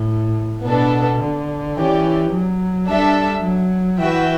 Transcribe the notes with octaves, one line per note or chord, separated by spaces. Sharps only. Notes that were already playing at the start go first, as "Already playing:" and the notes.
Already playing: A2
B2 B3 D4 A4
D3
E3 C#4 G4 D5
F#3
G3 D4 A4 E5
F#3
E3 F#4 B4 E5 G5